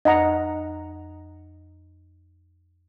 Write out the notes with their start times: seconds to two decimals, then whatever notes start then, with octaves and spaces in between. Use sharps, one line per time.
0.05 F2 D#5 F#5 A#5